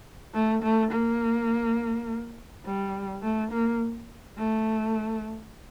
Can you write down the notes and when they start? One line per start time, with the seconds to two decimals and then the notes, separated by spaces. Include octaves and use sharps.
0.34 A3
0.63 A3
0.92 A#3
2.66 G3
3.23 A3
3.53 A#3
4.39 A3